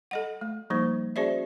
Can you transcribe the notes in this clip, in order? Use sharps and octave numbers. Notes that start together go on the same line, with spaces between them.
A4 D#5 F#5
A3
F3 G3 A#3 D#4 C5
C#4 F#4 G#4 C5 D5 E5